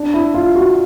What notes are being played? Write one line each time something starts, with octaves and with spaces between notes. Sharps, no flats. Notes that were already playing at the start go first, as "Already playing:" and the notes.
Already playing: D4
E4
F4
F#4